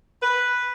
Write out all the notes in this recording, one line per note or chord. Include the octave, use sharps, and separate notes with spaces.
B4